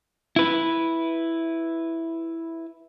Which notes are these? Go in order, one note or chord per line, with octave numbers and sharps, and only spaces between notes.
E4 B4